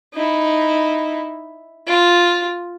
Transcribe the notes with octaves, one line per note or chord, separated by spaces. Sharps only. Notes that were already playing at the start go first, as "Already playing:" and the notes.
D#4 E4
F4